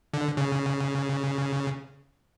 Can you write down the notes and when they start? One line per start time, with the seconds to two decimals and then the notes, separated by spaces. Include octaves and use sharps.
0.14 D3
0.37 C#3